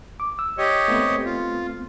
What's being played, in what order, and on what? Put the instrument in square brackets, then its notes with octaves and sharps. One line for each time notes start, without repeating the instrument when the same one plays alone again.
[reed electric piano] D6
E6
[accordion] G4 C#5 D#5
[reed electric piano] A3 B3 C4
[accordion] F4